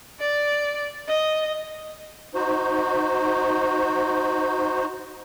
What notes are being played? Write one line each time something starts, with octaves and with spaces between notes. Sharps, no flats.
D5
D#5
D#4 F#4 C5